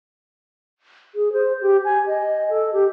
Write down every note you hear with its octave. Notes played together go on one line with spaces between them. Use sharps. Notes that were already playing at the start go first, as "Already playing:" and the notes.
G#4
C5
G4
G#5
D#5
A4
G4